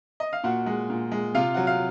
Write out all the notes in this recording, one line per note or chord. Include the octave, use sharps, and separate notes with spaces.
D#5
F5
A#2 F#4 F#5
G#3
A#2
G#3
C3 F4 F5
F#3 F#5
F5